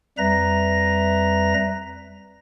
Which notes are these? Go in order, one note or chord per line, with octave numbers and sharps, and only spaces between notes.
F2 G3 B4 E5 A#5 A#6